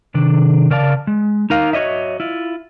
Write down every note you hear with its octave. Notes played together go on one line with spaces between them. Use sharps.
C3 D#3 D4
C#3 A#4 D5 F5 A5
G#3
D#4 A#4 F5
F#4 C#5 D#5 E5
E4 F4